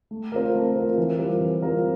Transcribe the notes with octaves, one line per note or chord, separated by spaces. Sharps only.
A3
C4 F4 A#4
A3
C4 F4 A#4
E3
G3 C4 F4 A#4
E3
G3 C4 F4 A#4